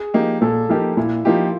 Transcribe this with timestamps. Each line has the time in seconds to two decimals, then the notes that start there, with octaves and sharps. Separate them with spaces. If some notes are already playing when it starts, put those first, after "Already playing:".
Already playing: G#4
0.14 F3 A#3 D#4 G4
0.41 A#2 A4
0.69 F3 A#3 D#4 G4 A#4
0.97 A#2 E4
1.25 F3 A#3 D#4 F4 G4